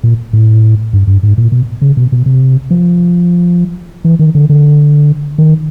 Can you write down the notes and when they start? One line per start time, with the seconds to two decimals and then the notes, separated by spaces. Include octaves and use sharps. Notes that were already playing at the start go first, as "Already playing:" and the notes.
0.04 A#2
0.33 A2
0.93 G2
1.07 G2
1.23 G#2
1.38 A#2
1.52 B2
1.82 C#3
1.97 B2
2.12 B2
2.26 C3
2.71 F3
4.05 E3
4.19 D#3
4.35 D3
4.49 D3
5.38 D#3